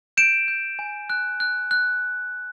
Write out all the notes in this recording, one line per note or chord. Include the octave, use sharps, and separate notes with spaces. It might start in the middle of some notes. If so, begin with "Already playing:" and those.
G6 D7 E7
G6
G#5
F#6
F#6
F#6